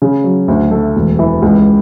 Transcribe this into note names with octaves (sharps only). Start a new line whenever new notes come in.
C#3
F#3
D2
A3
E1
E3
C#2